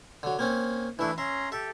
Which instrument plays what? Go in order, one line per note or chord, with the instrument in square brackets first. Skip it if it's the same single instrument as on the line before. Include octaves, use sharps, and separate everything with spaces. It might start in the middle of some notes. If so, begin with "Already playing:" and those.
[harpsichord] D3 F#3
A#3 C4 C#4
[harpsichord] E3 E5 [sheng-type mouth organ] A3 D4 E4
[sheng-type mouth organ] C#4 A#5 C6 [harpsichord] E5
[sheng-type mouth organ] G4 A4 [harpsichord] E5